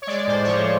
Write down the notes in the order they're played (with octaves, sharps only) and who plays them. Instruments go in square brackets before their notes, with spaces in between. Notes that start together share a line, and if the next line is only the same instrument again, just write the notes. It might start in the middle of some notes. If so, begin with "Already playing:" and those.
[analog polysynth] C#5
G#3 D5
A2 C5
C#5
F3 C5